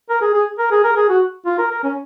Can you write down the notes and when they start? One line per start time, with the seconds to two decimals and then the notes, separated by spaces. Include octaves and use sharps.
0.09 A#4
0.21 G#4
0.34 G#4
0.59 A#4
0.71 G#4
0.84 A#4
0.96 G#4
1.09 F#4
1.46 F4
1.59 A#4
1.71 A#4
1.83 C#4